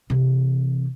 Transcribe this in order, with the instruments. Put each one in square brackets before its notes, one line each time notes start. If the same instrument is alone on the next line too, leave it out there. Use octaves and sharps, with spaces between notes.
[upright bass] C3 E3